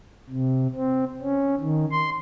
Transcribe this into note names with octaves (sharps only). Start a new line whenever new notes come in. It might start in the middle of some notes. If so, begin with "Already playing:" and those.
C3
C4
C#4
D#3
C6